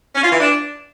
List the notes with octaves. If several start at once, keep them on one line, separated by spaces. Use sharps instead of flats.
C#4
F4
E3
D4